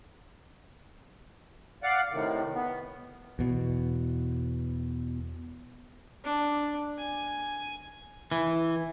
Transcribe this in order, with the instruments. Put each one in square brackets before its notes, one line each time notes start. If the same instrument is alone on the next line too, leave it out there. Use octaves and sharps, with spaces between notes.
[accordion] D5 F5 F#5
A2 C3 D#3
B3
[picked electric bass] E2 B2
[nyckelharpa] D4
G#5
[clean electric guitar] E3